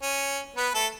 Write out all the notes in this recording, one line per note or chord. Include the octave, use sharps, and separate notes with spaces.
C#4
B3 B4
A3 A4